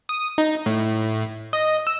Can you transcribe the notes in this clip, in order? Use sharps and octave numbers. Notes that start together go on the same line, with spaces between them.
D#6
D#4
A2
D#5
E6